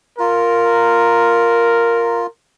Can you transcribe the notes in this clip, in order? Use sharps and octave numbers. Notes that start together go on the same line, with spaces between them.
F4 A#4